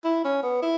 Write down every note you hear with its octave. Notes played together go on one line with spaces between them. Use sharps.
E4
C#4
B3
E4